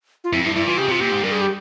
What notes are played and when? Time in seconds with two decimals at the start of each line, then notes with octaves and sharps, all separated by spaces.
0.24 F4
0.32 F2 E4
0.45 G2 E4
0.55 G2 E4
0.67 E3 F4
0.78 C#3 G4
0.89 C3 F4
1.00 A#2 G4
1.11 G#2
1.24 G2 A#4
1.32 G#4
1.42 G4